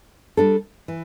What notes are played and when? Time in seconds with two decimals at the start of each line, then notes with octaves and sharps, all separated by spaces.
0.37 G3 D4 A4
0.88 E3